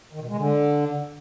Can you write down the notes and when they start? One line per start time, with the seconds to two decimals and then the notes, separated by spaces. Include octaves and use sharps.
0.13 D#3
0.21 B2
0.29 G#3
0.37 D3